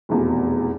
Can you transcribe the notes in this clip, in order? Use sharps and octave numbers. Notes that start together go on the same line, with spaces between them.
F1 E2 B2